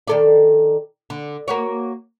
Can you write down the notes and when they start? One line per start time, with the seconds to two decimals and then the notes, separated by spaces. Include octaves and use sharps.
0.07 D#3 A4 D5
1.10 D3
1.48 A#3 F#4 C#5